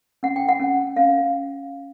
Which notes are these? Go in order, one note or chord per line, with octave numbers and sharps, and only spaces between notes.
C#4 F#5
G5
F#5
C#4
C#4 F5